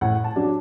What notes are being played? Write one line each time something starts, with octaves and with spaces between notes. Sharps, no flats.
A2 F#5
A5
F#3 D4